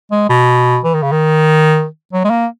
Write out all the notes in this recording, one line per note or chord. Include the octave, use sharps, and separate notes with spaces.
G#3
B2
E3
D#3
C#3
D#3
F#3
G#3
A#3